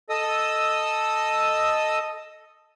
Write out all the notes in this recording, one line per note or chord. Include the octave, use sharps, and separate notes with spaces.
A4 D#5 D#6 E6